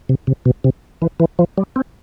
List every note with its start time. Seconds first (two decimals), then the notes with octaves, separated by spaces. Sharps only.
0.09 C3
0.27 C3
0.45 B2
0.64 C3
1.02 E3
1.20 E3
1.39 F3
1.58 G3
1.76 C4